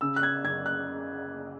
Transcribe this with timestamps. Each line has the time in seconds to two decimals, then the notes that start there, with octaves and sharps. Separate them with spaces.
0.01 C#3 E6
0.16 F#6
0.23 G#6
0.44 F#1 G#6
0.66 F#6